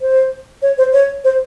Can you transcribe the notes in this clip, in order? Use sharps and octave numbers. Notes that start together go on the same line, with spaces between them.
C5
C#5
C5
C#5
C5